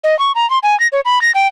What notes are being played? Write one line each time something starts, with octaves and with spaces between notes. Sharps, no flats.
D#5
C#6
A#5
C6
G#5
A#6
C#5
B5
A#6
G5